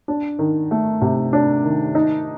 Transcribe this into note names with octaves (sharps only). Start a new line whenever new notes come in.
D4
D#3
A3
C3
D4
D#3
D#4